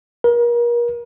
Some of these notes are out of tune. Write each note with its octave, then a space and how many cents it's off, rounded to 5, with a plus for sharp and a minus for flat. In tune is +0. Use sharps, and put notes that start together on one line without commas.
A#4 +35